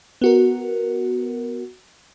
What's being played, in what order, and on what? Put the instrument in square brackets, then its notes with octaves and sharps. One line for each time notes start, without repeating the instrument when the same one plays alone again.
[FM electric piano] B3 F#4 A#4